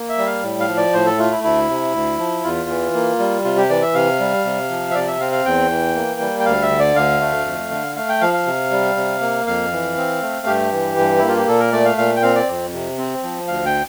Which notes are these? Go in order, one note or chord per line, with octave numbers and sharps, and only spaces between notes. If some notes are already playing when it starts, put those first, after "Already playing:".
Already playing: A#3
E5
G3
F5
A2
F5
F3
D5
A2 C5
A4
A3 F4
E4
D2 E4
C3
D2
F3
E2 F4
E3
A#3
G3
C3 F4
G4
E3 D5
E5
C3 F5
G3
C3
F3
E5
C3 D5
E5
C4 F5
F5
E2 G5
E3
A#3
G3
G5
D2 F5
E5
D3
D5
D2 F5
A3
F2
D3
A3 F5
G5
F3 F5
F5
C3
G3
C3
A#3
F2 F5
E3
C4
A3
G2 G4
E3
G2
A#3 E4
F4
G4
A#2 A4
A#4
A3 D5
F5
A#2 F5
G5
C4 F5
D5
F2
C3
C4
F3
D2 F5
G5